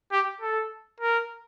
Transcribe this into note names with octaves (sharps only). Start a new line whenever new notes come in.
G4
A4
A#4